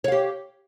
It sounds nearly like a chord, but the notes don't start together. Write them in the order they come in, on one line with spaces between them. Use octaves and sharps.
C#5 F5 G4